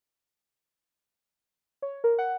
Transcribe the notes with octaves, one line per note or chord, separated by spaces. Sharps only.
C#5
A#4
F#5